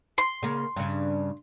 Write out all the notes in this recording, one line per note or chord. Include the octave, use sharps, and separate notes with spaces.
C6
C#3 A#3
G2 C#3